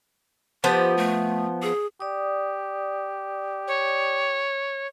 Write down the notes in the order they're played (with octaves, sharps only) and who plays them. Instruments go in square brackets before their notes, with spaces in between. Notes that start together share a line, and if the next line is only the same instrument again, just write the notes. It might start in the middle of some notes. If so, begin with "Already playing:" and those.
[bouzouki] F3 B3 C5 [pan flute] G4
[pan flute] A3
G#4
[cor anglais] G4 [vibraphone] D5 D#6
[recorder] C#5